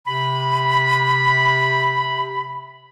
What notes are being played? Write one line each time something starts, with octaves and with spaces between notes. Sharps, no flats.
C3 B5